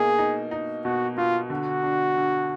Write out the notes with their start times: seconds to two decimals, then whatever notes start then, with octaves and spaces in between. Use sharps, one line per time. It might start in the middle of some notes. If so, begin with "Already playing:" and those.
Already playing: B2 A#3 D#4 G#4
0.18 D#4
0.51 D#4
0.85 B2 F#4
1.17 B2 F4
1.50 D3 F#4
1.83 D4
2.17 D3